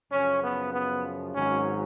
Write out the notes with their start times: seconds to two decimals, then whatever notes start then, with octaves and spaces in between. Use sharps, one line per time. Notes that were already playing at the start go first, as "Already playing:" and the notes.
0.12 F#2 C#3 F3 C#4
0.43 B3
0.74 B3
1.35 G#1 G#2 D#3 F#3 C#4